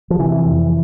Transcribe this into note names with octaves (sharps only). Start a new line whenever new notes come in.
F3
C3 E3
F2